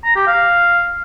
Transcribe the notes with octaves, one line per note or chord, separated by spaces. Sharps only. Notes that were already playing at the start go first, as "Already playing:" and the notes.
A#5
G4
F5